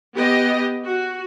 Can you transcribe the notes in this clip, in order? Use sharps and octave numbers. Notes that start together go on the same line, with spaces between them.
B3 G4 D#5
F#4